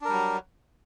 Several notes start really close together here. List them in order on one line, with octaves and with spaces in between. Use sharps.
D4 A#4 G3 F#3